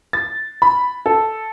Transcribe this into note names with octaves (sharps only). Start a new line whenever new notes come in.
A6
B5
A4